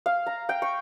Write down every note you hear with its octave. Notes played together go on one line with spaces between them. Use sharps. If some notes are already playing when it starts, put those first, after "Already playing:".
F5
A#5
G5
C#6